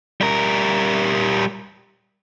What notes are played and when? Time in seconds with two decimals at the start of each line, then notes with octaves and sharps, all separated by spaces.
0.21 G3 A#4